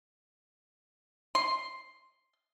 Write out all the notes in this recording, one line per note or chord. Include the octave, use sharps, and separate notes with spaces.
C6